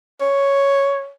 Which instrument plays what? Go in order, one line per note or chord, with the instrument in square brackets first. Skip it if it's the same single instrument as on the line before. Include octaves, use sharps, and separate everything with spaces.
[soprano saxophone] C#5